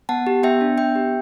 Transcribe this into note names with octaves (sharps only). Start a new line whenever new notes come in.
B3 F#5 A5
G4
B3 E5 G5
D4
B3 E5 G5
G4